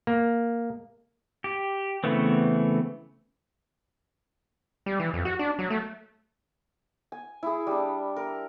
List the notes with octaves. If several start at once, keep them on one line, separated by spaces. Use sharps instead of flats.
A#3
G4
C#3 E3 A3 B3 C4
G3
E3
F2
F#4
D4
F#3
A3
G#5
E4 G#4
G3 D4
A#4